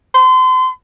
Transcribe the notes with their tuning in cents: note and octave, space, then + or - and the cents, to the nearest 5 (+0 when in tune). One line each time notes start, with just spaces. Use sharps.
C6 -35